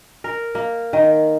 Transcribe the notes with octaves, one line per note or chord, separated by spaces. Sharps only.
A#4
A#3
D#3